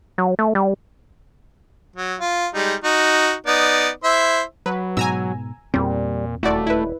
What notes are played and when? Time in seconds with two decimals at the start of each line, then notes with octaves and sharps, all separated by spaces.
0.18 F#3
0.39 A3
0.55 G3
1.96 F#3
2.20 F4
2.54 G3 G#3 D#4
2.84 D#4 F#4
3.46 B3 D#4 D5
4.04 E4 C5 E5
4.66 F#3 B4
4.97 G#2 B2 G#5 A#5 E6
5.74 E2 A#2 G3 C4
6.43 D#1 A3 E4 F#4 D5
6.67 E4 B4